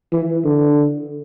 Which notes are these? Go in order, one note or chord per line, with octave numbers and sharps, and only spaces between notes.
E3
D3